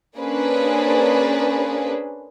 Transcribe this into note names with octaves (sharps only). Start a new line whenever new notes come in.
A#3 C#4 D4 G#4 B4 C5